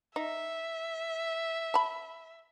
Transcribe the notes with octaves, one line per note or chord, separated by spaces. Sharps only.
D#4 E5
A5 B5